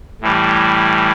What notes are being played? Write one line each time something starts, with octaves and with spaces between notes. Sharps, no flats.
A2 E3 G3